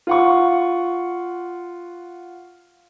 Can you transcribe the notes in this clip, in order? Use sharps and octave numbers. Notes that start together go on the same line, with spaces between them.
F4 F#5 C#6